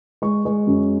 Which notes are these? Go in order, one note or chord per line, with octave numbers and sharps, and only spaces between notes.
G#3 C#6
G#3
F#2